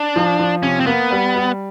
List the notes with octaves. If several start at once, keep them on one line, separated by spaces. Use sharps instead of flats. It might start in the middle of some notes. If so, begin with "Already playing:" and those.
Already playing: D4
F3
F3
C3 C#4
C4
A#3 B3
G3
G3